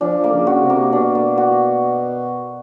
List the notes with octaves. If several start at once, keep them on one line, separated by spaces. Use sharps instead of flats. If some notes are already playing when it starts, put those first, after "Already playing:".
F3 D4
A#3
C#3
F#4
C3
A#3
B2 D4
A#3
F#4